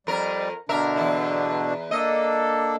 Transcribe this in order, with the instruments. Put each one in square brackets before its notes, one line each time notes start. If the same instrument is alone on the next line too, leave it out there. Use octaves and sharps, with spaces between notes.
[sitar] F2 A#4 [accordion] G3
[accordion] B2 D3 D4 [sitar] A#4 E5
[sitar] E2 G#2 E4
[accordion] A#3 D4 A4 [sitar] D#5